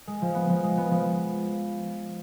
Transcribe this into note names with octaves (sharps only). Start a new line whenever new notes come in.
G#3
F3
B3
F3
G#3
B3
F3